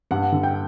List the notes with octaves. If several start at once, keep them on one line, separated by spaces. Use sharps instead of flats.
G2 F#5
D3
G5